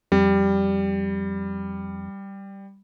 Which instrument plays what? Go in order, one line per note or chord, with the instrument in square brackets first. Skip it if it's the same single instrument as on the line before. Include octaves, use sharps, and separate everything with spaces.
[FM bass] F2 [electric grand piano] G3